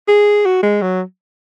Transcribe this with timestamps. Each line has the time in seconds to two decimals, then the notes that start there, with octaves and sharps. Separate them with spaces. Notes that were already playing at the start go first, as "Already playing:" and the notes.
0.08 G#4
0.45 F#4
0.63 G#3
0.82 F#3